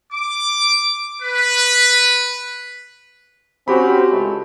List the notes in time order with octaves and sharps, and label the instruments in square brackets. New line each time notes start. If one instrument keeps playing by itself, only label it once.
[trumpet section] D6
B4
[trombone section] C4 C#4 [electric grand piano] F#4 G4 B5
[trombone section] C#2 G#3 A3